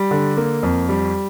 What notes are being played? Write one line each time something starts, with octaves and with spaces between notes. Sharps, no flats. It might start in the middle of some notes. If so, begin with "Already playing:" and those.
Already playing: G3
D3
A#3
F2
G3